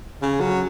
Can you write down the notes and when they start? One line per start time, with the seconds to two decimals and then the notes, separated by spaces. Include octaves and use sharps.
0.22 C#3
0.41 F#3